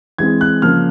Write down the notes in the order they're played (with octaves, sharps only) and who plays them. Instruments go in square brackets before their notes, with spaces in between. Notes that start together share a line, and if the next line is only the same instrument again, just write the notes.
[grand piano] E3 G#3 C4 G#6
F#6
C#3 F3 A#3 F6